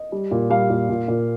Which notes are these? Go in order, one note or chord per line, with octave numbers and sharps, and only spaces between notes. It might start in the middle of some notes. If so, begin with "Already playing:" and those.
Already playing: D#5
G3
A#2
G3 F5
A#2
A#2
A#2